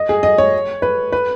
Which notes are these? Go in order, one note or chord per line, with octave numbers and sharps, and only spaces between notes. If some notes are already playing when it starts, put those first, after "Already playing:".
Already playing: D#5
G#4
D#5
C#5
B4
B4